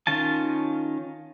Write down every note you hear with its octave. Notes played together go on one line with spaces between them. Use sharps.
D#3 C#4 F4 A5